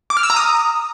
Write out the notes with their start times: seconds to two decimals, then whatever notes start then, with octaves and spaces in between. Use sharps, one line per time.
0.10 D6
0.17 F6
0.23 E6
0.30 A#5
0.36 D#6